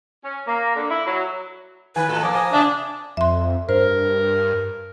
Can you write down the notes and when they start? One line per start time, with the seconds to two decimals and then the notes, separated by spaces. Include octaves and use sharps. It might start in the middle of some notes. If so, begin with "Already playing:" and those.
0.24 C#4
0.47 A#3
0.75 D3
0.90 E4
1.06 F#3
1.96 D#3 B4 G#5
2.08 A2 F#4 A4
2.22 F3 A#3 A5 D6 D#6
2.34 G#5 D#6 A#6
2.53 C3 D4 E5
3.17 F2 E5 C6
3.69 G2 A#4 C5